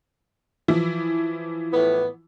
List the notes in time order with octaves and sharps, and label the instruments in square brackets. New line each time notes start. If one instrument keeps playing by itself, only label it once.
[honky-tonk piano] E3 F3 E4
[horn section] A2 B3